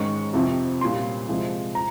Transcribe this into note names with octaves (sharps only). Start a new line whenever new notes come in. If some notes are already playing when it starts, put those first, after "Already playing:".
Already playing: G#2 D#3 G#3 C#4 C#6
F2 C3 F3 C4
A#2 G3 C#4 C6
C3 F3 G#3
A#5